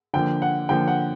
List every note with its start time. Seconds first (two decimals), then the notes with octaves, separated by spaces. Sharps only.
0.14 D3 F3 A#3 G5
0.42 F#5
0.69 D3 F3 A#3 G5
0.88 F#5